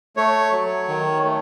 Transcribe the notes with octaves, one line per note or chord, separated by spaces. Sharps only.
A3 C#5
F#3
D#3
A3